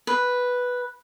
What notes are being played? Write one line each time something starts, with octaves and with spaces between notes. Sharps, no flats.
B4